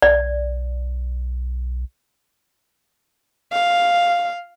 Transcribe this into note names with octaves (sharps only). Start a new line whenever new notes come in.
B1 D5
F5